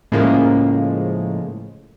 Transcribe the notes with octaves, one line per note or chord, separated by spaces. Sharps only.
A2 C#3 F3 G#3 A#3